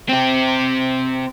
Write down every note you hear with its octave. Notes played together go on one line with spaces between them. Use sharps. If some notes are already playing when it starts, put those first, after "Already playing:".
C4 G4